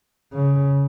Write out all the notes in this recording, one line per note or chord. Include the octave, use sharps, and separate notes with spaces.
C#3